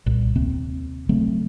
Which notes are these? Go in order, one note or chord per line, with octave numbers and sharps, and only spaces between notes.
C2 A#2
D#2 C3 A#3 C4
C#3 F#3 A3 C4